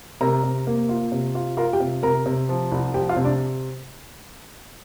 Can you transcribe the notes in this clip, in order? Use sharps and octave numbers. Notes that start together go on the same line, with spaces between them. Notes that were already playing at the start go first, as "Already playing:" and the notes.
C3 A#4 A#5
C3
A#3
F4
C3
F4
F4 A#4 A#5
G4 G5
C3
C3 A#4 A#5
C3
F3
C2
F3 G4 G5
F4 F5
C3
D4 D5